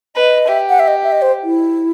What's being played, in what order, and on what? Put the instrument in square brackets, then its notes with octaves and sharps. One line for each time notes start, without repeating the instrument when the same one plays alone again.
[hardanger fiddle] B4 [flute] D#5
[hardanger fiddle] G4 [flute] E5
[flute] F#5
E5
D#5
E5
D#5
C5
E4